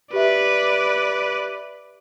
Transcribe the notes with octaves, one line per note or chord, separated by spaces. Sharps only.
G4 B4 D5 E5